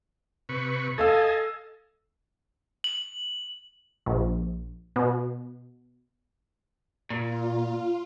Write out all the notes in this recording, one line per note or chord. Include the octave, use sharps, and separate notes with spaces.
C3 B4 C#6
A4 D#5 F5 G#5 A5 E6
F#7
A#1
B2
A#2 F4